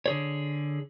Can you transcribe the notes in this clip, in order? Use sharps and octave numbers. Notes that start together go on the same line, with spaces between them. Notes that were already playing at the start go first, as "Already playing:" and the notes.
D3 G#4 C#5